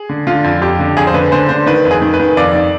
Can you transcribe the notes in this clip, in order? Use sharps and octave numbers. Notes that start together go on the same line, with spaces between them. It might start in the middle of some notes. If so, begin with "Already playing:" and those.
Already playing: G#4
D3
D3 F4
F2
F2 G4
D3
F2 G#4
C5
D3 B4
D3 C5
D3 C5
D#3 B4
F2
G#4
D#3
B4
D#3
F2 D5
D#3